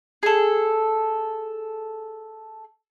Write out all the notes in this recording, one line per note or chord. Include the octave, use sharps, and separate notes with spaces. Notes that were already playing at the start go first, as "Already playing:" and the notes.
G#4 A4